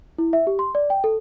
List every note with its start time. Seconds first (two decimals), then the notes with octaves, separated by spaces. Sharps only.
0.18 E4
0.33 E5
0.47 G4
0.59 C6
0.75 D5
0.90 G5
1.04 A4